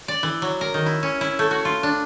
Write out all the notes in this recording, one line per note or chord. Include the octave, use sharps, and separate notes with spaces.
D5
E3
F#3
A#4
D#3
E4
C#4
E4
A3
F#4
F4
D4